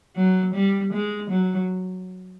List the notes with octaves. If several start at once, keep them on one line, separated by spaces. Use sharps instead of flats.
F#3
G3
G#3
F#3